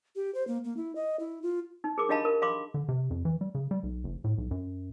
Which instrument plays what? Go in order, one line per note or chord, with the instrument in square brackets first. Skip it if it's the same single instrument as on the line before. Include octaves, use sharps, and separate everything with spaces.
[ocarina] G4
C5
A#3
A#3
E4
D#5
E4
F4
[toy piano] D#4
G#4 A#4 D6
D4 G4 D#5 F5 A5 B5
A#4
F5 B5 C6 D6
[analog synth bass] D3
C3
F2
E3
G3
C#3
G3
B1
F#1
A2
B1
F#2